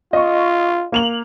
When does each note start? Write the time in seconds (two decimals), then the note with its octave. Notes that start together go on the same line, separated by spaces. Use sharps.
0.13 F4 D#5 C#6
0.92 A#3 F7 F#7